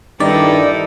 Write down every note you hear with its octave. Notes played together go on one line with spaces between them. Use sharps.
G2 D#3 D#4 E4 A4 D5